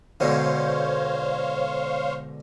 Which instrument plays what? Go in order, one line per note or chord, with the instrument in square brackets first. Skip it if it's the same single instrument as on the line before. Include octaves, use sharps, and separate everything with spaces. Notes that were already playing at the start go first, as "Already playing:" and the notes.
[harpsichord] G#2 B2 D3 [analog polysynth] C5 C#5 F5